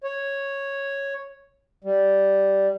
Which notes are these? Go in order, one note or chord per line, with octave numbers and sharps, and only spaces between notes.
C#5
G3